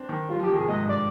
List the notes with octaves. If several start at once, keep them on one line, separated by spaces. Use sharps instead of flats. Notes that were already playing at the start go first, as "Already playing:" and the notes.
Already playing: C4 D4
D#3
G3 F4
F3 G4
D#3
C3 G#4
G#2 D#5
G2
D5